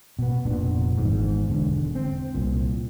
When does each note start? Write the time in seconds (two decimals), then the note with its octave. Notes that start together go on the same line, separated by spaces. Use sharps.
0.19 B2 B3
0.45 F1 A#2 B3 D4
0.98 G#1 E2 G#2
1.50 E1 D3
1.95 C4
2.35 C2 A#2